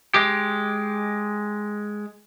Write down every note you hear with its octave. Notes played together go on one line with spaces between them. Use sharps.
G#3 G4